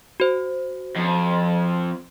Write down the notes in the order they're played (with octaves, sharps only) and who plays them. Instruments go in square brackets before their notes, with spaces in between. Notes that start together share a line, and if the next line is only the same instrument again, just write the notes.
[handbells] F#4 C5
[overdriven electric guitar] F2